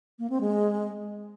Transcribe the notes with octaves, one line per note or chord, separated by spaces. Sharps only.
A#3
C4
G#3